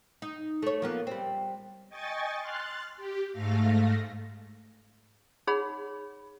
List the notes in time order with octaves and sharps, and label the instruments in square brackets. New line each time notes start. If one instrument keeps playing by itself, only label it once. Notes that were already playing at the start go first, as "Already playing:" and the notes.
[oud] D#4
A3 C#5
F3 A#3 B3
G3 C4
[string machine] D#5 G5 G#5 C#6 A6
C6 F6 F#6 A6
G4
G#2 A3 F5 A#6
[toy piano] D#4 G#4 C#5 F#5 B5